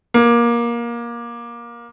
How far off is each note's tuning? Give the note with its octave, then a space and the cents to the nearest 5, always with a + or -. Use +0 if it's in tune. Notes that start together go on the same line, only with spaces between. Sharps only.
A#3 +20